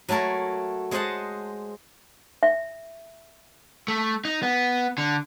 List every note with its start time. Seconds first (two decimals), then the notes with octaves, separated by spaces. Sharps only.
0.09 F#3 A3 E4 A4 A#4
0.91 G#3 G#4 C5 D#5 F#5 A5
2.43 E5
3.88 A3
4.25 D#4
4.43 B3
4.98 D3